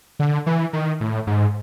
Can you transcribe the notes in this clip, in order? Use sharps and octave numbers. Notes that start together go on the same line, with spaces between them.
D3
E3
D#3
A2
G#2